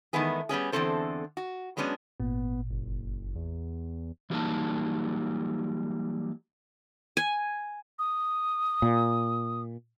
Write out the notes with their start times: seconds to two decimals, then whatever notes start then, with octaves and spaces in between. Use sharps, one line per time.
0.13 E2 D#3 G#3 A3 B3 G#4
0.49 G3 B3 C#4 G#4
0.72 E2 D3 E3 C4 A4 C5
1.37 F#4
1.77 F#3 G#3 B3 C#4 D4
2.20 G#1 A#2 B3
2.71 F#1
3.35 E2
4.30 E3 F#3 G3 A#3 D#4 A5
7.17 G#5
7.99 D#6
8.82 A#2